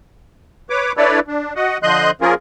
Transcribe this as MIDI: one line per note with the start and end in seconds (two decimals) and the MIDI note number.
0.70 0.92 71
0.70 0.92 73
0.70 0.92 86
0.97 1.20 62
0.97 1.20 64
0.97 1.20 69
0.97 1.20 71
0.97 1.20 73
0.97 1.20 74
1.28 1.53 62
1.56 1.78 66
1.56 1.78 75
1.56 1.78 78
1.83 2.11 50
1.83 2.11 53
1.83 2.11 75
1.83 2.11 84
1.83 2.11 90
1.83 2.11 91
2.21 2.34 53
2.21 2.34 58
2.21 2.34 61
2.21 2.34 65
2.21 2.34 68
2.21 2.34 70